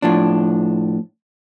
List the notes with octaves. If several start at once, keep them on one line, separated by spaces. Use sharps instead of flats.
A2 F3 D4